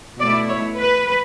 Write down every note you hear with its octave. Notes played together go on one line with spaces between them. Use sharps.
B2 A3 E4 D5
C#5
B4